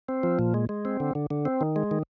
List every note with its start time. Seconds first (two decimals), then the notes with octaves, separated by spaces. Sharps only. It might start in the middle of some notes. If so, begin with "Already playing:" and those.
0.09 C4
0.23 F3
0.39 A#2
0.54 G#3
0.69 G#3
0.85 C4
1.00 D3
1.15 D3
1.30 D3
1.45 C4
1.61 D#3
1.76 G#3
1.91 D#3